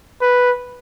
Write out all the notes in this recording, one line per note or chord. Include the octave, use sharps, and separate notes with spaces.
B4